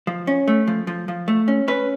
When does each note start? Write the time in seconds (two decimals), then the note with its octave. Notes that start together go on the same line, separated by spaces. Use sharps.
0.07 F3
0.27 C#4
0.48 A3
0.67 F3
0.87 F3
1.08 F3
1.28 A3
1.48 C#4
1.68 C#4 B4